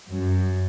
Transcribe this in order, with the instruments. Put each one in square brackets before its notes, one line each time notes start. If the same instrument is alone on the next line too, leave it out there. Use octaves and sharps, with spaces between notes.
[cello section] F#2